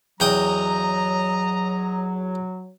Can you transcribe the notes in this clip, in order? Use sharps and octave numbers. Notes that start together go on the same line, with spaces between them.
E2 F#3 D#5 G5 A#5 D#6